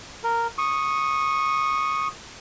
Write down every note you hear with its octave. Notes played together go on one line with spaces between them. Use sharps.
A#4
C#6 D#6